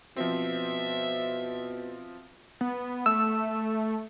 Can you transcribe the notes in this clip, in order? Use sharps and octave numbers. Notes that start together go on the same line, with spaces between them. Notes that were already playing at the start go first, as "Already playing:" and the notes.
B2 F3 C4 E5
B3
A3 E6